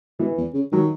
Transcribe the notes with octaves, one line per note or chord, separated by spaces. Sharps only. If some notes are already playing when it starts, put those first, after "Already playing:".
B2 E3
E2
C#3
D#3 F#3